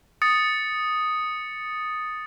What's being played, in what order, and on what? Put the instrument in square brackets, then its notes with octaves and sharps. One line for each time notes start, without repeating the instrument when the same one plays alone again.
[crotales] D#6 A6 C#7